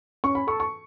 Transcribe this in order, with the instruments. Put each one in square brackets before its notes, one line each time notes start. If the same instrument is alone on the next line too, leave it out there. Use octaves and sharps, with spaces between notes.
[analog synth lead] C#4 [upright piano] C#6
[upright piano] B5
[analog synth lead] A4 [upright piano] C#6
[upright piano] C#6